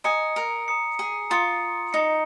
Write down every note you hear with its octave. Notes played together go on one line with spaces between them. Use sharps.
D#5 G#5 A#5 D#6 C#7
A#4
A#5 D#6 C#7
G#4
F4 A#5 D#6 C#7
D#4 A#5 D#6 C#7